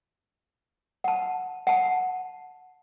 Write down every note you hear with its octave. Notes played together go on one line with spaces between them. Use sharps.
F#5 A5
F#5 A5